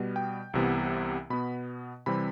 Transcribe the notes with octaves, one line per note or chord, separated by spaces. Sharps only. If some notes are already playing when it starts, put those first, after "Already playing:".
Already playing: B2 G3 B3
G5
C2 C3 E3 B3
B2 B3 B5
C3 E3 G3 C4 B5